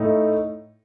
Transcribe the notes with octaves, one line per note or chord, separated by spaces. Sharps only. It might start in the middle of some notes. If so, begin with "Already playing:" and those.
Already playing: A2 A3 D#4